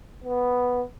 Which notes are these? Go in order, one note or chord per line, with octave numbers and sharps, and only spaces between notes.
B3